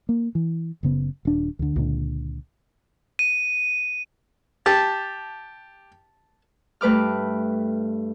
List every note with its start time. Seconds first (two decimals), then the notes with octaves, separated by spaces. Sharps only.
0.09 A#3
0.35 E3
0.83 F#1 C#3 B3
1.25 D#1 D4
1.59 D2 D3
1.76 C#2 A#2 D3
3.19 D#7
4.66 G4 A5
6.81 G2 A3 B4 D6 F6